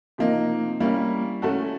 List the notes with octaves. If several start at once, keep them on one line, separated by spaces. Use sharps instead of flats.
C3 F3 A#3 D#4
G3 A#3 C#4 E4
A3 C#4 F#4 A4